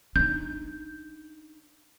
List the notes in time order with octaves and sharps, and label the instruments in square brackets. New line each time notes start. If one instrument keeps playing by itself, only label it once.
[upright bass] D4 D#4 [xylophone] G6